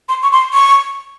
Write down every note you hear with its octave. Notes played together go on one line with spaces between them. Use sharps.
C6
C#6
C6
C#6